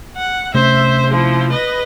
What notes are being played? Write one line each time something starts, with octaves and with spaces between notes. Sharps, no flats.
F#5
C3 A3 C#4 C5 E5
F3 E4
B4 D#5